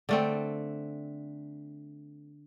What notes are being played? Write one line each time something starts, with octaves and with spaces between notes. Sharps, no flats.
D3 A3 C4